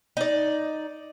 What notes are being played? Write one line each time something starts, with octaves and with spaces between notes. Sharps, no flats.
D#4 D5